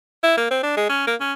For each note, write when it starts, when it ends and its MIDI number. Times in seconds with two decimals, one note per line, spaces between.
0.23 0.34 64
0.37 0.51 58
0.51 0.59 60
0.63 0.74 62
0.77 0.89 56
0.89 1.06 61
1.07 1.15 58
1.21 1.33 61